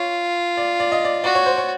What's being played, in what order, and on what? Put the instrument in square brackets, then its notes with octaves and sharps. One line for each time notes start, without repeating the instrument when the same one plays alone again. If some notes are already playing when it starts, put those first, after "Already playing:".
Already playing: [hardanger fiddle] F4 [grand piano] C#5
[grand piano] D5
D5
D#5
D5
[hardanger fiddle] F#4 [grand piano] D5
[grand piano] C#5
C5
C#5